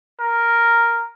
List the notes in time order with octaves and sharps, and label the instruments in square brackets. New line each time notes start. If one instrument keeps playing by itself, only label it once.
[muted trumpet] A#4